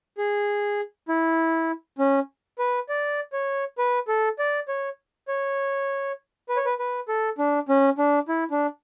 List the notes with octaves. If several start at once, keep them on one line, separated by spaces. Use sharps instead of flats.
G#4
E4
C#4
B4
D5
C#5
B4
A4
D5
C#5
C#5
B4
C#5
B4
B4
A4
D4
C#4
D4
E4
D4